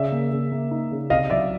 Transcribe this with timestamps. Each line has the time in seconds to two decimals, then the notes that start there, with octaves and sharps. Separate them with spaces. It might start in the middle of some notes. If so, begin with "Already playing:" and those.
Already playing: C#3 D5 E5
0.12 A#3
0.31 C#3
0.52 A#3
0.71 D#4
0.91 C#3
1.10 C2 D#5 F5
1.30 F#3 D5 E5